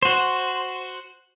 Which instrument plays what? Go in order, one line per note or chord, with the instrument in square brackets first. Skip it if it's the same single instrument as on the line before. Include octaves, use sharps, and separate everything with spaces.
[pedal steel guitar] F#4 C5